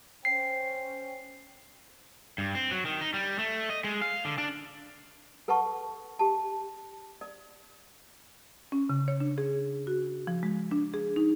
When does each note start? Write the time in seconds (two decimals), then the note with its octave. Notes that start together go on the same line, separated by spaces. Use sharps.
0.25 C#4 C5 G5 C7
2.38 G2
2.55 C4
2.71 F#3
2.85 D#3
3.01 D#4
3.14 G3
3.39 A3
3.70 D#5
3.84 G#3
4.02 F5
4.25 D3
4.38 D4
5.48 A4 B4 F#5 A5 C#6
6.19 G4 A5
7.21 D5
8.72 C#4
8.89 C#3
9.08 C#5
9.20 D4
9.38 G#4
9.87 F#4
10.27 F3
10.43 G#3
10.71 D4
10.94 G#4
11.16 D#4